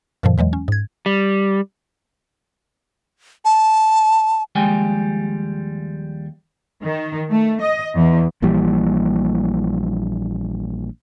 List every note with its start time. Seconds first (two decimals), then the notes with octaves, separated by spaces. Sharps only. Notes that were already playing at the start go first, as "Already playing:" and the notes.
0.23 F#2 A#2 D3 D#3 F3
0.38 E2 E3 F#3 G#3
0.53 C#4
0.68 G#2 G#6
1.06 G3
3.45 A5
4.55 D#2 F3 G3 G#3 G5 G#5
6.82 D#3
7.30 A3
7.61 D#5
7.95 E2
8.42 A#1 A#2 E3 G3